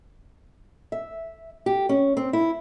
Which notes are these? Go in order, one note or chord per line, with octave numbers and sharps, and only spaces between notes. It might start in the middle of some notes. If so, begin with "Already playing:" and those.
E5
G4
C#4
C4
E4